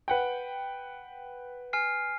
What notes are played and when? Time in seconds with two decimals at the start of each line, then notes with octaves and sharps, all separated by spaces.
0.08 B4 F#5 G5
1.73 G#5 F6 C7